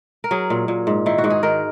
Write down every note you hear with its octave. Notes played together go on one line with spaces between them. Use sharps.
A#4
F#3 G#4
A#2
A#2
G#2
D#3 E4
F#4
G#2
G#4
D#3 A#4